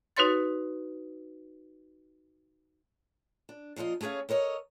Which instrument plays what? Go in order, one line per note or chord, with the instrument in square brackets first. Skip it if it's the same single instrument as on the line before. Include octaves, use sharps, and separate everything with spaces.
[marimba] D#4 F#4 B4 C#5 C6 A6
[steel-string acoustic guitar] D4
A#2 F3 F4 C5 D#5
A3 C#4 G#4 C#5 F5
A4 A#4 C#5 D#5